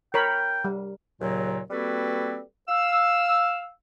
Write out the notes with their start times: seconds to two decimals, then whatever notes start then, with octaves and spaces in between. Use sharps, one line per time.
0.14 A#4 C#5 G5 B5
0.65 G3
1.21 D#2 A#2 C#3 F#3
1.70 G3 A#3 C4 F#4 A4 B4
2.68 F5 E6